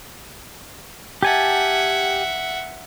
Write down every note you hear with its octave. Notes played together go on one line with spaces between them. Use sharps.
G4 E5 F#5 G#5 A5